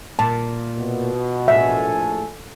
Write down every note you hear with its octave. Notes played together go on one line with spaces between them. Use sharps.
A#2 A5
B2
A#1 A2 A4 E5 G#5